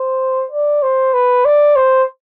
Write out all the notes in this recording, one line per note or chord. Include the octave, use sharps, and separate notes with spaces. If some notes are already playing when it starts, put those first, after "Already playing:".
Already playing: C5
D5
C5
B4
D5
C5